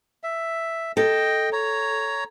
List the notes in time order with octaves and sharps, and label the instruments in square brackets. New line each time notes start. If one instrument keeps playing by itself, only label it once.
[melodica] E5
[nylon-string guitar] A4 [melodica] D#5 G5
[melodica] C#5 A#5